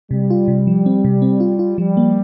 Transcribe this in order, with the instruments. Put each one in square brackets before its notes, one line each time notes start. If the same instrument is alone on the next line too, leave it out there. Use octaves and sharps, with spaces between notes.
[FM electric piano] C3 [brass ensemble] G3
[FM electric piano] F4
C3
F3
C4
C3
C4
F4
F4
[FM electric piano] F3 [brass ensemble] G3
[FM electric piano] A#3